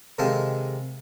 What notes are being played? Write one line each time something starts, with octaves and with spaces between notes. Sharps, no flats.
C3 D#3 G#3 A4 F5 A5